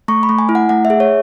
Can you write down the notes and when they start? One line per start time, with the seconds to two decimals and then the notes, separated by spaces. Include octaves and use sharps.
0.08 A3 C#6
0.23 B5
0.29 A3
0.39 G#5
0.49 E4
0.55 F#5
0.69 A3 F#5
0.85 E5
0.90 G#4
1.00 C#5